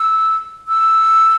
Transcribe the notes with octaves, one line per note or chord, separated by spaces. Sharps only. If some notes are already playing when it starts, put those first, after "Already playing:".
Already playing: E6
E6